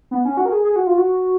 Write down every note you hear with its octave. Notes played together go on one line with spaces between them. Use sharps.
B3
C#4
F#4
A#4
G#4
G#4
F#4
F4
F#4